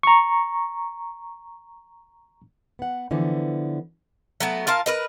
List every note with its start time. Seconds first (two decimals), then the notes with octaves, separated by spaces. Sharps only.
0.03 A#5 C#6
2.79 B3 F#5
3.11 D3 E3 F3 B3
4.40 F#3 A3 B3
4.67 F4 A#4 F5 A5
4.86 A#4 B4 D#5